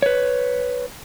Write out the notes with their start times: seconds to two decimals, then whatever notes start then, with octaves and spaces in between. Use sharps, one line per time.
0.02 B4 C#5